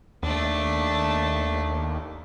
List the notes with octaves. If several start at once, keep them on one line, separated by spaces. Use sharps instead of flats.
D#2 A3 D4